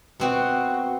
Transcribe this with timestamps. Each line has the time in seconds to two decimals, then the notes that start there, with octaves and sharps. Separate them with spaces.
0.20 B2 C4 F#4